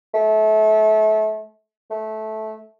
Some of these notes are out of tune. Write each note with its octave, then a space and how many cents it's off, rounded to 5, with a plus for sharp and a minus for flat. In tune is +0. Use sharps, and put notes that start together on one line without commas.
A3 -30
A3 -15